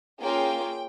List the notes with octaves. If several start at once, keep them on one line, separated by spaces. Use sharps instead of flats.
A#3 C#4 F4 G#4 G5